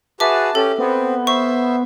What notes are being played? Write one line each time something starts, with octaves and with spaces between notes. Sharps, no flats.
F#4 G#4 B4 E5 A5 D6
C#4 G4 A4
B3 C4
C5 E5 C#6